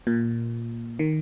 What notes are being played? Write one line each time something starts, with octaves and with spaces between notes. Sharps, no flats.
A#2
D#3